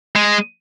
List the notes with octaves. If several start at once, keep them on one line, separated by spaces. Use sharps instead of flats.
G#3